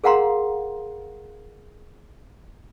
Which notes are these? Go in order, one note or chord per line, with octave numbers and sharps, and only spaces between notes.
G#4 A#4 F5 F#5 A#5 C6